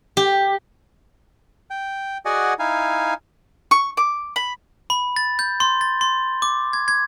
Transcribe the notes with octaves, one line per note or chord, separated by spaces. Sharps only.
G4
G5
F#4 G#4 D5 D#5 F#5 G#5
D#4 E4 F5 G#5
C#6
D6
B5
B5
A6
G6
C6
A6
C6
D6
G#6
G#6